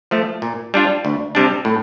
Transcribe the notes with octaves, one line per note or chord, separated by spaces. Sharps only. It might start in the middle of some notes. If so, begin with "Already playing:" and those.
F3 A3
A#2
G3 D4 F4
D2
C3 G3 D4
A2